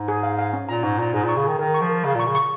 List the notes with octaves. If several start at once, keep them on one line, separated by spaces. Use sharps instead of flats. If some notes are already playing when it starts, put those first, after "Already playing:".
Already playing: G#2
G#4
F5
F5
C#4
A#2 A#5
G#2 C#6
A#2 A#5
G#2 G#4
A#2 C#6
C#3
D#3 G#4
D#3 A#4
C#6
F3
A#4
C#3 F5
A#2 C#6
C#3
C#6